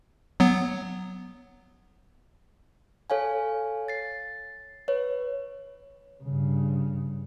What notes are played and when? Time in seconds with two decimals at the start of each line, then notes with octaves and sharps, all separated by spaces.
0.40 F#3 B3
3.10 A4 C#5 F5 G#5
3.88 A6 C7
4.88 B4 C#5
6.24 G2 C#3